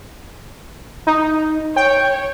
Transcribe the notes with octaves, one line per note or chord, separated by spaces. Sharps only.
D#4
C#5 G5